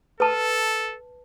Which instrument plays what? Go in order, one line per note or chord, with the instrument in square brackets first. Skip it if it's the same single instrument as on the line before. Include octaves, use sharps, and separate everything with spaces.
[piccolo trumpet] A4 [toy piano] B4 A5